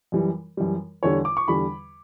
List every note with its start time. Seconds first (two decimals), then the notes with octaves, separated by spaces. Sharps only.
0.12 F#2 E3 G3
0.57 F#2 E3 G3
1.03 E2 D3 G3 C#5
1.25 D6
1.37 C#6
1.48 E2 D3 G3 B5